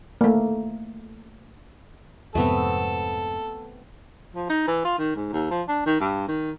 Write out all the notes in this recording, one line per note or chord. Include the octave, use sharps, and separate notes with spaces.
A3 A#3
F2 G#2 C3 A3 B3 C4 A4
F3
D#4
E3
F4
D#3
G#2
D#2
F3
D4
D#3
G2
D#3